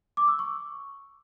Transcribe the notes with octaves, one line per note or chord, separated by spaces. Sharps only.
D6
E6
C#6